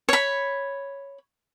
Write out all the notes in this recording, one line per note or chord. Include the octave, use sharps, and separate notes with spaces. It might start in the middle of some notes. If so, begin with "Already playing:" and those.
C#5 B5